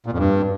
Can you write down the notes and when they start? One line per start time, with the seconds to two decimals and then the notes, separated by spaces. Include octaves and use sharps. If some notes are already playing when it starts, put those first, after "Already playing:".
0.06 A#2
0.12 F2
0.18 G2